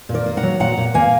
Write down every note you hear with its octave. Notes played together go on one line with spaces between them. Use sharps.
A#2
A#4 D5
A#3
F#5 A#5
F#3
A#2 F#5 A#5
A#2
A#3 F5 G#5